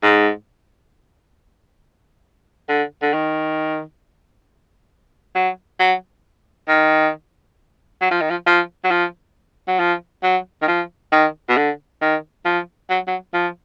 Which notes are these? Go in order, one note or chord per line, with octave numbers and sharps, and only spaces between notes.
G#2
D3
D3
D#3
F#3
F#3
D#3
F#3
F3
D#3
F3
F3
F#3
F3
F#3
F3
F#3
D#3
F3
D#3
B2
D3
D#3
F3
F#3
F#3
F3